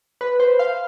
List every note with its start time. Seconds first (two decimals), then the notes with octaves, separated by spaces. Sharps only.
0.21 B4
0.40 C5
0.59 F5